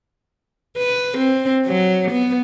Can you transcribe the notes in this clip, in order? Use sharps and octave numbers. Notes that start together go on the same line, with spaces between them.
B4
C4
F#3
B3